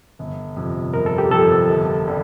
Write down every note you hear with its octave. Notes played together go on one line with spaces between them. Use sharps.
G1
F2 C3
G1 A#4
A4
G4
F2 C3 A4
G1
D3 G3